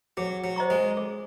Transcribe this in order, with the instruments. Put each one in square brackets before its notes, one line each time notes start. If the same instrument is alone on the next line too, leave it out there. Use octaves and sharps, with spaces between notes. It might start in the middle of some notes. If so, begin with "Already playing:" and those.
[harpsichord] F#3 [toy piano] G#4
[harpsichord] F#3
[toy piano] C5 D#5 A#5 C#6
[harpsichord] G#3
[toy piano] G#4